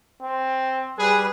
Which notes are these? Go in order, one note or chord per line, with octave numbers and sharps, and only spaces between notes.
C4
G3 G#4 B4